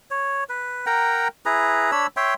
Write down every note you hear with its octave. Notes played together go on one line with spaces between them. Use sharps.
C#5
B4
A#4 F#5 G5 A#5
E4 G#4 B4 A#5
D4 C#5 B5 E6
C#5 E5 G5 C6